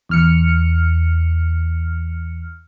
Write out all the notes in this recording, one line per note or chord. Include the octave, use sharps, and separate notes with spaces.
E2 F6 C#7